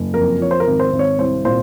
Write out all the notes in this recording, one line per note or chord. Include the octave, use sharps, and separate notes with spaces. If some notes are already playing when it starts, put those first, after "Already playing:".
Already playing: F#1
F2 A#4
F3 C#5
C5
A#4
G#1
C5
G#1
C#5
C2 C5
A#2 C5